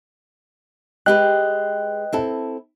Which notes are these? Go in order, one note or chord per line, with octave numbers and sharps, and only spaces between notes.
G#3 G4 B4 D#5 G5 F#6
C4 E4 A4